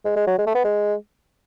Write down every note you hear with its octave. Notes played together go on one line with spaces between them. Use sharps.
G#3
G#3
F#3
G#3
A3
B3
G#3